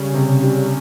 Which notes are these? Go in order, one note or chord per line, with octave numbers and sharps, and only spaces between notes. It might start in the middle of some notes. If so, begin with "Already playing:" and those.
Already playing: C#3 G3
C3
G3